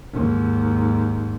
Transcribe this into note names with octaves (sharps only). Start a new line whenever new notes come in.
D#2 G#2